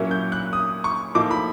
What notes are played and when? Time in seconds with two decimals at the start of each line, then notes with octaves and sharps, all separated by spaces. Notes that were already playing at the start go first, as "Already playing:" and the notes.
Already playing: A#2 F#3 A#3 C#4 E4
0.11 G6
0.32 F#6
0.53 D#6
0.84 C#6
1.15 A2 F3 A#3 D#4 D6
1.31 B5